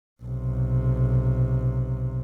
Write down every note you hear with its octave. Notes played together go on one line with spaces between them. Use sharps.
B1 C3